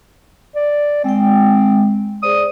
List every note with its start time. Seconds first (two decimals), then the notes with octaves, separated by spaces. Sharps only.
0.55 D5
1.04 G#3 C4 G5
2.23 G#4 C5 D5 D#6